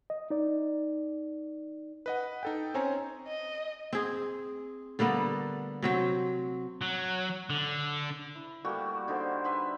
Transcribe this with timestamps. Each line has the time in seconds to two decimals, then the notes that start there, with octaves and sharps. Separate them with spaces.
0.10 D#5
0.30 D#4 D5
2.06 B4 D#5 F#5
2.43 D#4 A4 G5
2.74 C4 C#4 C5 C#5 G#5 A#5
3.27 D#5
3.93 C4 G#4
4.99 D3 G3 A#3 B3
5.83 C3 F#3 C4
6.81 F#3
7.50 D3
8.35 E4
8.65 G3 A3 A#3 F#4
9.08 D3 D#4 A#4 C5
9.44 B4 E5 B5 C6